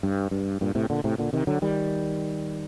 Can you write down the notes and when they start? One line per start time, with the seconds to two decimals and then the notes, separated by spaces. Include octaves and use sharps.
0.03 G2
0.31 G2
0.61 G2 A#2
0.75 A2 C3
0.90 A#2 D3
1.04 A2 C3
1.18 A#2 D3
1.33 C3 D#3
1.47 D3 F#3
1.62 D#3 G3